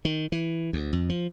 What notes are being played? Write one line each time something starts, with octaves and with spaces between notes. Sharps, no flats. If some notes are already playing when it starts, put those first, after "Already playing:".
D#3
E3
D2
F2
F3